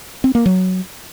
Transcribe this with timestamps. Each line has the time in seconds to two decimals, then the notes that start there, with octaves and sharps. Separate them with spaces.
0.24 C4
0.35 A#3
0.46 F#3